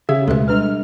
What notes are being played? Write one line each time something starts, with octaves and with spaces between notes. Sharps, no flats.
C#3 G4 G#4 E5 F5
D2 B2 G#3 A4 E5
G3 D4 B4 F6